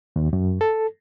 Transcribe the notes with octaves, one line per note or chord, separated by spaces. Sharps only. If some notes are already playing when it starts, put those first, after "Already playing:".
D#2
F#2
A4